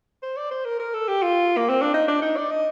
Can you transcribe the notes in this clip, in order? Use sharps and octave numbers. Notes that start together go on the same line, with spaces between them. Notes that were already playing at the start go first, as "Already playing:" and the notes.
C5
D5
C5
A#4
A#4
A4
G4
F4
A#3
C4
D4
D#4
D4
D#4
D5
D#5